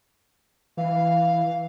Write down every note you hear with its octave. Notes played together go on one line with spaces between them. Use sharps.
E3 F5